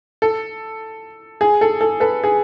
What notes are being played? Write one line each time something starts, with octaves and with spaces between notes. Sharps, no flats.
A4
G#4
A4
A4
A4 B4
G#4